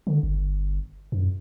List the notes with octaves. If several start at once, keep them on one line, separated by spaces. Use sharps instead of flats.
D3
G1
F#2